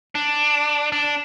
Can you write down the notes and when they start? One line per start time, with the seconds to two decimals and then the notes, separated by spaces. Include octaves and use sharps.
0.15 D4
0.92 D4